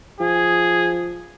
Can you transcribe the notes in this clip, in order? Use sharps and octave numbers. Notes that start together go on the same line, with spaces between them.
F3 G#4